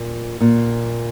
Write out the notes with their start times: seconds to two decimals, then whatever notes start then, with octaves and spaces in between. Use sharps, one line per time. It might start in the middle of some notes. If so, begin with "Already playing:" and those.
Already playing: A#2
0.41 A#2